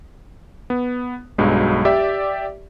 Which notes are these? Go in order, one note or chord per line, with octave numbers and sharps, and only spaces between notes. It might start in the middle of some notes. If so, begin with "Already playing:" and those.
B3
B1 G2 F#3 G#3
G4 D5 E5